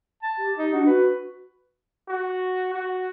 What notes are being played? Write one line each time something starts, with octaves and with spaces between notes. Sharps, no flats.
A5
G4
D#4
D4 F#4
F#4 B4
F#4
F#4